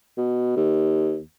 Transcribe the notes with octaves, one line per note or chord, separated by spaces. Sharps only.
B2
D#2